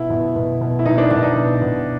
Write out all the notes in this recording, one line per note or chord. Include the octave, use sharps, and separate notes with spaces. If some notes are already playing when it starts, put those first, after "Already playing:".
Already playing: B2 E4
B2
B2
B2
E4
B2 D#4
D4
B2 D4
D#4
B2
B2